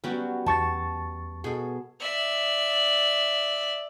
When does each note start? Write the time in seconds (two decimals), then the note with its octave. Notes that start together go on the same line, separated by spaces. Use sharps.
0.04 F#3 G3 B3 C#4 F#4 G5
0.46 E2 G5 A5 C#6 A6
1.44 B2 G#4 A4
2.00 D5 E5